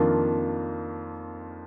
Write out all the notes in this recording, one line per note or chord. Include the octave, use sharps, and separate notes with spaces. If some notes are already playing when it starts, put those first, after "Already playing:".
Already playing: F2 D#3 A#3 D4 F4